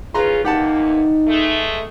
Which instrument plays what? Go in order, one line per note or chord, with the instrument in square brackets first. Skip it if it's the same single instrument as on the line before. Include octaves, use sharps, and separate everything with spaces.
[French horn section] C#4 F4 [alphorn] G#4 [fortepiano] B4 A#5 C6
[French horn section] E2 A#3 [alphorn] D#4 [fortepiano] G4 F#5 A5
[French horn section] E3 G#3 A3